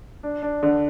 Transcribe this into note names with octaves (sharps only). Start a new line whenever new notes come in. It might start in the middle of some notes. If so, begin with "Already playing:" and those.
D4
D4
D3